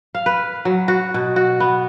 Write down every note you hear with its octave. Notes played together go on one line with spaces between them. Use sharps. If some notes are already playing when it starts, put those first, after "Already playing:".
F5
B4
F#3
F#4
B2
F#4
B3